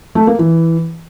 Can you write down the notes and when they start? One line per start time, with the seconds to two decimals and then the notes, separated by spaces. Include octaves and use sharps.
0.15 A3
0.27 A#3
0.39 E3